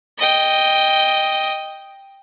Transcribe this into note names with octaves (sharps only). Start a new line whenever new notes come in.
D#5 G5